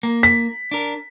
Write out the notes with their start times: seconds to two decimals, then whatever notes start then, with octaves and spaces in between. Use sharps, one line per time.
0.03 A#3
0.23 B6
0.71 D4 A#4